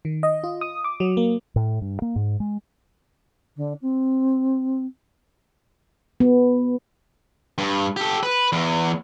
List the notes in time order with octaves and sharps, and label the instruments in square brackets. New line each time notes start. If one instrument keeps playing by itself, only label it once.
[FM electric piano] D#3
D#5
F4
D#6
D6
F#3
A#3
[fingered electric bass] A2
G2
A#3
G#2
G#3
[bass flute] D3
C4
[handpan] B3
[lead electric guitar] G2
G4 A4
B4
E2